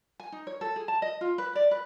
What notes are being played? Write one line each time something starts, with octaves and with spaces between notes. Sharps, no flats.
G#5
D#4
C#5
A4
G#4
A5
D#5
F4
B4
D5
B4